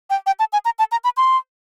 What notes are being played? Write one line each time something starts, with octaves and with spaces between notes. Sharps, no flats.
G5
G5
A5
G#5
A#5
A5
A#5
B5
C6